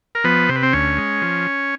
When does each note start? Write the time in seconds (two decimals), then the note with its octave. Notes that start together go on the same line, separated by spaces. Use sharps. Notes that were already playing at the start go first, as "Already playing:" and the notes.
0.15 A#4
0.24 F3 B3 B4
0.49 C3 C5
0.56 B4
0.63 C4 C5
0.73 D2 C#4 C#5
0.98 G#3
1.22 F3